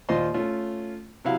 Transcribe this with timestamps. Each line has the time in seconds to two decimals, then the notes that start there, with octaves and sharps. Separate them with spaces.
0.09 D#2 A#2 F4 C5 D#5 C6
0.34 A3 C#4 F4
1.25 C3 F#3 E4 F5